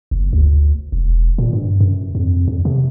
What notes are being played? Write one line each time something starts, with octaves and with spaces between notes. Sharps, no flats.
F#1
D2
E1
A#2
G2
F#2
F2
F2
C3